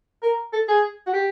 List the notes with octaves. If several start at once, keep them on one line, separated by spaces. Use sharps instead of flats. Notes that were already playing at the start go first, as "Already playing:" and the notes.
A#4
A4
G#4
F#4
G4